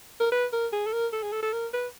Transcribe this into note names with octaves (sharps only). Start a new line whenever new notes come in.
A#4
B4
A#4
G#4
A4
A#4
A4
G#4
A4
A4
A#4
B4